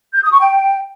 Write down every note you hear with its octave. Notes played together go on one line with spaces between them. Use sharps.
G6
D#6
C#6
G5